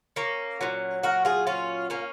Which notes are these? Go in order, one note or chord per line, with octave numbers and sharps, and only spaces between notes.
A#3 C#4
A#2 F#3
F#4 A#4
F4 G#4
C#4 F4
A#3 C#4